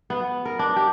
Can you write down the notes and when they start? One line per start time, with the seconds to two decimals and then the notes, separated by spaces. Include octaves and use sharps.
0.10 B3
0.45 A#4
0.59 D4
0.76 G4